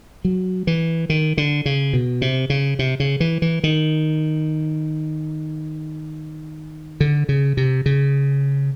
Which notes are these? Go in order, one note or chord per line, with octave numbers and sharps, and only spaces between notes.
F#3
E3
D#3
D3
C#3
B2
C3
C#3
C3
C#3
E3
E3
D#3
D3
C#3
C3
C#3